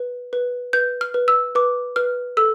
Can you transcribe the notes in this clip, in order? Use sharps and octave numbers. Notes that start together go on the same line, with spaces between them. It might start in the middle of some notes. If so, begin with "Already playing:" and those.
Already playing: B4
B4
B4 G6
F6
B4
E6
B4 D6
B4 F6
A4 E6